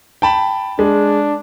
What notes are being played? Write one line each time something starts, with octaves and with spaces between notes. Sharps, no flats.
G5 A5 B5
G#3 D4